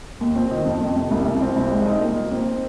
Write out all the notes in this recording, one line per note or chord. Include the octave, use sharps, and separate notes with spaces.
D#2
C4
D#3
F2
F2
C3
C2
C2
C4
C2
G#3
D#4
A#3
A#3
C4